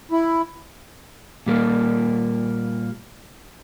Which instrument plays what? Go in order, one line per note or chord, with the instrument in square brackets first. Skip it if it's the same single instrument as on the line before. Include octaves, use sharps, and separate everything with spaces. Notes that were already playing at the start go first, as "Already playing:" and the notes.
[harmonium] E4
[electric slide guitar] A#2 G3 A#3